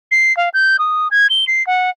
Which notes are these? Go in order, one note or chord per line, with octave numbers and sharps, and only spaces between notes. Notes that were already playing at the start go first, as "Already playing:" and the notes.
C7
F5
G6
D#6
G#6
G7
C7
F#5